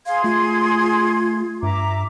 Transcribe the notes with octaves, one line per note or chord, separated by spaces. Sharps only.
G#4 F5 C6 G#6
A3 F4
G2 E5 A#5 D6